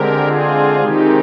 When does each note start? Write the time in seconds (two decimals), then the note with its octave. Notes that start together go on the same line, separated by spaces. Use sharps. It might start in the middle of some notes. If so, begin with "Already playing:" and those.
Already playing: D3 G#3 C4 G4 A#4
0.26 F4 G#4
0.81 C3 D#3 G#3 C4 D#4 G4